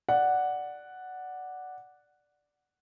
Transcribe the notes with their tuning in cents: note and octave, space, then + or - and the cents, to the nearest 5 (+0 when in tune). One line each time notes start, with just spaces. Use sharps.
D5 +0 F#5 +0